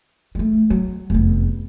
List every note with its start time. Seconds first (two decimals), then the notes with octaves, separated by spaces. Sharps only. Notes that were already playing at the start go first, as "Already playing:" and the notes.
0.35 G#3 A3
0.70 F#3
1.10 F1 E2